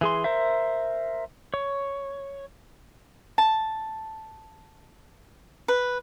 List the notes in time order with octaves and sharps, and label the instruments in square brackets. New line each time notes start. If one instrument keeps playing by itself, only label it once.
[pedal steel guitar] E3 G#4 C6
A#4 C5 E5
C#5
[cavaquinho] A5
B4